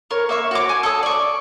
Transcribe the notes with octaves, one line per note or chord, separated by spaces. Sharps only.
A#4 C#5
A#3 E5 C#6
F#4 C#5 D6
G#5
A4 D#6
D5 C#6